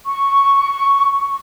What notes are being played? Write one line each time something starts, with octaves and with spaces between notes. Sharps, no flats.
C#6